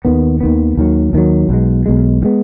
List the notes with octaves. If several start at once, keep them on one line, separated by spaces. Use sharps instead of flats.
D#2 D#3 B3
D#2 D#3 B3
D#2 D#3 F#3
D#2 D#3 F#3
B1 B2 G#3
B1 B2 G#3
D#3 G#3 B3